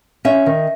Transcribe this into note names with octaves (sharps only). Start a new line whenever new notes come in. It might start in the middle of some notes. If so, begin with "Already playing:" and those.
C#4 E5
D#3